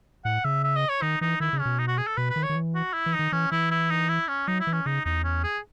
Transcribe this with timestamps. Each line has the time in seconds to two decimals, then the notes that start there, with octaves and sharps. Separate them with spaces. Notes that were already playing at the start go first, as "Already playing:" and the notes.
0.25 A2 F#5
0.45 C#3 E5
0.64 E5
0.76 D#5
0.89 C#5
1.02 D#3 D#4
1.21 E3 D#4
1.40 D#3 E4
1.53 C#3
1.59 C#4
1.65 B2
1.79 D#4
1.88 F#4
1.98 G#4
2.07 A4
2.17 B2 B4
2.30 B4
2.36 D#3
2.43 C#5
2.49 D#3
2.55 E3
2.75 F#4
2.94 E4
3.06 E3
3.13 D#4
3.19 D#3
3.32 E3 C#4
3.52 E3 E4
3.71 E4
3.90 D#4
4.09 E4
4.28 C#4
4.48 F#3 D#4
4.60 E4
4.67 E3
4.73 C#4
4.86 C#3 D#4
5.05 E2 D#4
5.24 C#4
5.43 G#4